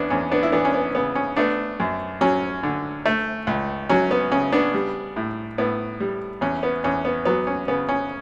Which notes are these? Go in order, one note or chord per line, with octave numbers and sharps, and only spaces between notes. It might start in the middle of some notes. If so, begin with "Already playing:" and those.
Already playing: E2 B3 C#4 D4
E2 C#4
B3 D4
E4
E3 B3 D4
C#4
B3
C#3 B3
C#4
A3 B3 D4
F#2
F#3 C#4
D3
A3
C#2
F#3 C#4
B3
C#3 C#4
B3 D4
G3
A2
A2 B3
G3
E2 C#4
B3
E2 C#4
B3
F#3 B3
C#4
C#3 B3
C#4